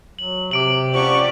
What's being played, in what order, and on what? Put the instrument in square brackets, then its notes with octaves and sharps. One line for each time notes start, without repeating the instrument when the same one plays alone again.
[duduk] F#3 [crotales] F#7
[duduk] C3 [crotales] D6 D7 F#7
[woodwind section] F3 F#5 C#6 [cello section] C#4 G4 D5